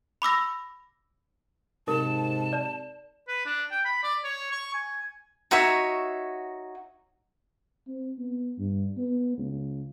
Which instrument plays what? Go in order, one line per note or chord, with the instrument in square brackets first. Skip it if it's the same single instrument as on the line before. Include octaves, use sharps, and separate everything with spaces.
[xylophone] B5 D6 E6 A#6
[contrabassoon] G#2 [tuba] C3 [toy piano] A#4 [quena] A5
[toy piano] D5
[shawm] B4
D4
G5
B5
D5
C#5
C#6
G#5
[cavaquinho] D#4 F#4 C#5 E5
[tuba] C4
B3
G2
B3
C#2